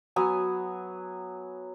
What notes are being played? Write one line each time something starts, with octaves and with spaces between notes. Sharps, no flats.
F#3 B3 G#5